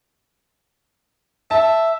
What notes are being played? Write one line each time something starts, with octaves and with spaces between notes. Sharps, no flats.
E5 A5